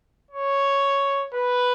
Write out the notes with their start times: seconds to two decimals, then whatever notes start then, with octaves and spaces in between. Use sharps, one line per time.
0.31 C#5
1.33 B4